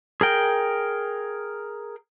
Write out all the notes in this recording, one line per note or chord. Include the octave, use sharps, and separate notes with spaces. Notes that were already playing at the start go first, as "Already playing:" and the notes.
G#4 A#4 G5